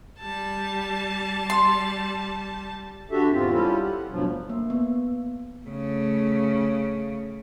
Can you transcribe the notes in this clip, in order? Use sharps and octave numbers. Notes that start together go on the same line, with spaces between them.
G3 A5
C6
D3 D4 F#4 G4 A4 E5
E2 G#2 C4 F4
G3 C#4 E4 F4 G4 A4
F#5
D2 G2 B2 F3 F#3
A#3
B3
C#3 A3